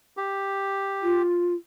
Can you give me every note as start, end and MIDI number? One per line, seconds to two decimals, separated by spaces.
0.17 1.22 67
1.03 1.54 65